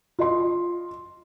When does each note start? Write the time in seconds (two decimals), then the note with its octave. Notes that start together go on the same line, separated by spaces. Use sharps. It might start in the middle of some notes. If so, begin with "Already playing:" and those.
0.19 F4 D#5 C6